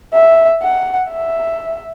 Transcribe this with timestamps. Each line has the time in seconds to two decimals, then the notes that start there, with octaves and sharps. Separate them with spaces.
0.13 E5
0.62 F#5
1.11 E5